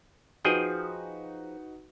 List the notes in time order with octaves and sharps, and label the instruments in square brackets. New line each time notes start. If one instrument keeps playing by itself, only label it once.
[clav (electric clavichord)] F3 G#4 G5 [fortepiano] D#4 F#4 B4